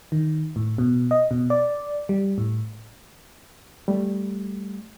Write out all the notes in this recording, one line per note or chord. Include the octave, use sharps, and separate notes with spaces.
D#3
A2
B2
D#5
B2
D5
G3
A2
G3 A3